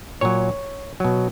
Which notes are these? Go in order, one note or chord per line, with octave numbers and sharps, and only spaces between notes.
A#2 F#3 C#5
B2 F#3